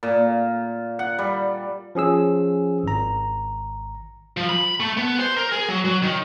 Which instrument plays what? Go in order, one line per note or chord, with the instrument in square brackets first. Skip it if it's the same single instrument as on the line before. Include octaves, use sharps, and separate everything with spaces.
[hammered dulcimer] A#2
F#5
G3
[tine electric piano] F3 C#4 G#4 E6
G#1 A#5
[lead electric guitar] F3
B5
A3
B3
C5
A#4
G#4
F#3
F#3
D#3